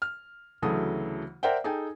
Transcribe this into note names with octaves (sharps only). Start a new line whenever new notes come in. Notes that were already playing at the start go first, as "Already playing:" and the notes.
F6
D2 C#3 E3 F#3 A4 D#6
A#4 C5 D5 E5 F#5 G5
D#4 G#4 A4 G5 G#5